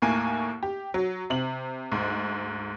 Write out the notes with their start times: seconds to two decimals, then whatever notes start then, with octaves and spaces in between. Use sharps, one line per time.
0.02 D#2 A2 A#3 G#5
0.63 G4
0.94 F#3
1.30 C3 F#7
1.92 D2 G#2